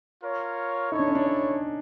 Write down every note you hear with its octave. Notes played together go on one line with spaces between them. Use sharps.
F4 A#4 C#5
D#4 E4 A4 C#5
D4
C#4
D4
C#4